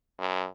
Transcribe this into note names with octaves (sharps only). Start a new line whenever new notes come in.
F#2